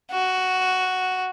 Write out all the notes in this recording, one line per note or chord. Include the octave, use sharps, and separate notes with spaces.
F#4